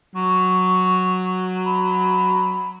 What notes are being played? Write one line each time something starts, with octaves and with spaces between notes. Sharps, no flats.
F#3 C#6
B5